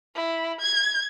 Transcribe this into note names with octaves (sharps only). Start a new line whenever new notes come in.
E4
G#6